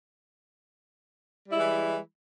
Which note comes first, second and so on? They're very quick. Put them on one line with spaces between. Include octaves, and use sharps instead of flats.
G3 E4 G#3 E3